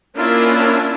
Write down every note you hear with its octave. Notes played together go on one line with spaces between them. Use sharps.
A#3 C#4 D4 E4 F4 A#4